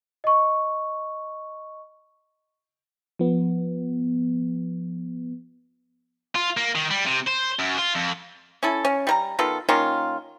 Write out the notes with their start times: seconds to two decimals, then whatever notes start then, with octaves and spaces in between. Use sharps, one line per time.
0.24 D#5 C#6
3.19 F3 B3
6.35 F4
6.57 A#3
6.75 D#3
6.91 G3
7.06 C3
7.27 C5
7.59 F#2
7.78 F4
7.95 F2
8.63 C#4 E4 A4
8.85 C#4
9.07 G3 A#4 A#5
9.39 D#3 B3 F4 A4
9.69 D#3 A#3 C#4 F4